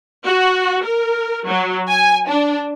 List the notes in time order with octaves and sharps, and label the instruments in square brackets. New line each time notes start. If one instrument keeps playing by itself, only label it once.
[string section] F#4
A#4
F#3
G#5
D4